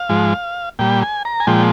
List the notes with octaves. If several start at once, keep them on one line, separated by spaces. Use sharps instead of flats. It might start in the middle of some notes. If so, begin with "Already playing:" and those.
Already playing: F5
G#2 F3 G#3
A#2 G3 G5
G#5
A#5
G#5
A#2 F3 G#3 G5